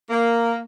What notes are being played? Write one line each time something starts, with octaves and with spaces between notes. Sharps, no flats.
A#3